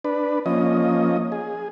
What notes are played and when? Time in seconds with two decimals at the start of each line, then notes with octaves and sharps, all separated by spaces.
0.05 D4 B4
0.46 F3 A#3 C#4 D#5
1.32 G#4